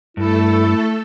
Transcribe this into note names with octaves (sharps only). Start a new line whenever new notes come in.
G2 A3 E4 A4